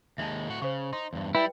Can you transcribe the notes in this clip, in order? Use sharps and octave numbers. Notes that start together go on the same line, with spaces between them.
D#2 G#3 E5 F5 A5
A2 F#4
C#3 C5 C#6
D#4 C6
E2 G2
G3 E4 B4 G5